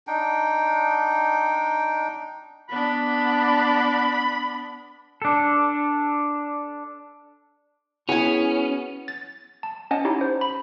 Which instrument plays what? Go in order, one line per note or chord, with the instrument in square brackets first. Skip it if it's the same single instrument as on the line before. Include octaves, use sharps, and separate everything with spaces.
[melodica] D4 D#4 G5
[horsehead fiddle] B3 D4 [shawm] B5
[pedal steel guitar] D4 A4
[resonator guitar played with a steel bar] B3 G#5 [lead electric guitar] C#4 [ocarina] E4 [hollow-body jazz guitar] F#4 G#4
[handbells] A6
A5
C#4 D#5 F#5 G#5 A5
C#4 D#4 E4 G4
C5
B5